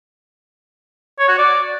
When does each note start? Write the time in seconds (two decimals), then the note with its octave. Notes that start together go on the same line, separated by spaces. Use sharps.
1.19 C#5
1.29 F#4
1.38 D5